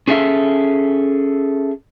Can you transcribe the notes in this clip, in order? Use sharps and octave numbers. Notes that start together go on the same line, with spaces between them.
C#4 G#4 A4 E5 F5